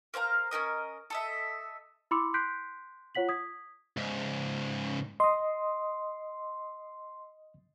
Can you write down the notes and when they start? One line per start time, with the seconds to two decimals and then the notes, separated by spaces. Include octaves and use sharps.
0.14 A#4 C5 F5 A#5
0.51 C#4 G4 A#4 D#5
1.10 A4 D#5 E5
2.11 E4 B5 C6 D6 E6 C#7
2.34 C6 F#6 G6 B6 C7 D7
3.15 F4 C#5 F#5 B6 F#7
3.29 D#6 G#6 B6
3.97 C#2 G#2
5.20 D#5 C6 D#6